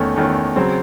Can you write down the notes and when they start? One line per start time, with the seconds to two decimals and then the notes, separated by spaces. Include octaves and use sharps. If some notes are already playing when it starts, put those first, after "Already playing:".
Already playing: E2 D#3 A3 C#4
0.16 E2 D#3 A3 C#4
0.56 C#3 F#3 C4